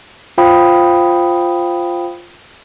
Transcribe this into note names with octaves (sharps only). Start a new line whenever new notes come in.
F4 C5 F5 G5 B5 D#6